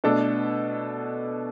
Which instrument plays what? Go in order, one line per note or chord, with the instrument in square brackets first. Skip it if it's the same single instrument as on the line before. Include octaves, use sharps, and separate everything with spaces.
[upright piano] B2 A3 D4 A4